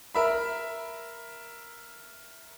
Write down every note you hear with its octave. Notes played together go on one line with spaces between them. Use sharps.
A#4 E5 B5